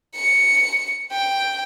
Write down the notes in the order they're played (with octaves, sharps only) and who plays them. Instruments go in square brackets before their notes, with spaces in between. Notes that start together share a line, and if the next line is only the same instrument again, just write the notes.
[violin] C#7
G5